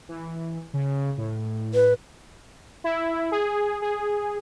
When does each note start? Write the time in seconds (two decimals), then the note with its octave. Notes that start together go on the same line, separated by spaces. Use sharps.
0.09 E3
0.73 C#3
1.17 A2
1.74 B4
2.84 E4
3.32 G#4
3.82 G#4